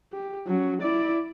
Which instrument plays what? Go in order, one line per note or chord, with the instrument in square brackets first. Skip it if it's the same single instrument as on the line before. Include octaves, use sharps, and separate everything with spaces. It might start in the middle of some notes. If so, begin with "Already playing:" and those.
[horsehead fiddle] G4
F#3 C#4
E4 D5